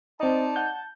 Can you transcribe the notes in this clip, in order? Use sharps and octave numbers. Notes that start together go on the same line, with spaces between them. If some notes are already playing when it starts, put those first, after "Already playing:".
C4 D#4 C5 D5 D#5 A5
F#5 G6